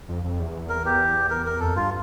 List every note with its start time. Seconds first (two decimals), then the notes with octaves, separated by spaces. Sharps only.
0.09 F2
0.24 F2
0.40 E2
0.69 A#4
0.85 G4
1.30 A#4
1.46 A#4
1.60 F2 A4
1.76 G2 F4